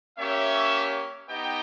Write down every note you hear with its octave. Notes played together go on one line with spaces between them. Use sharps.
A#3 C#4 G4 C#5 E5
B3 D#4 G4 D#5 G5